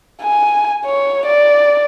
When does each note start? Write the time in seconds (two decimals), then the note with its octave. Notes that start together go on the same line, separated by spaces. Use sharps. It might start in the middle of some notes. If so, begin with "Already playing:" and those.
0.22 G#5
0.86 C#5
1.26 D5